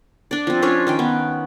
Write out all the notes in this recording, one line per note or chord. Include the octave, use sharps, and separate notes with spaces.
D4 D5
F3 C4
C#4 D4 F4 C#5
D#3 C#4 G5
B3